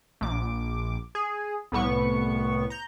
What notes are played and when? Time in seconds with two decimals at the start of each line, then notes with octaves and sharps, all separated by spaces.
0.21 A#1 D6
1.15 G#4
1.72 C2 A2 B3 C#6
2.70 A#5 G6